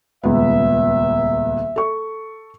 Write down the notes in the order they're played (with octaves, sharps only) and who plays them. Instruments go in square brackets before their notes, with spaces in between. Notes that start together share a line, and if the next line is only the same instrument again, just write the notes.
[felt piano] D#1 C#2 B3 [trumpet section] E5
[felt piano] A4 C#6